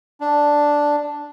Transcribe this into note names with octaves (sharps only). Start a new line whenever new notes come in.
D4